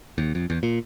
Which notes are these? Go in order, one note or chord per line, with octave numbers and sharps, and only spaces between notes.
D#2
F2
E2
A#2